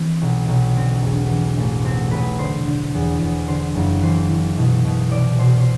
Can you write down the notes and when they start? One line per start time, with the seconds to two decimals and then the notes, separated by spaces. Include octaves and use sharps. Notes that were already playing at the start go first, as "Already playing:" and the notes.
Already playing: E3 C4
0.22 B1
0.48 B1
0.75 D3 C4
1.03 E1
1.30 E3
1.57 A1
1.84 B1 C4
2.11 B1 B4
2.39 D3 C5
2.67 D3
2.94 E2
3.21 E2
3.48 D3 C5
3.75 F#1
4.02 E3 C5
4.30 E3
4.57 B2
4.85 B2
5.11 C2 D5
5.39 B2 C5
5.60 C5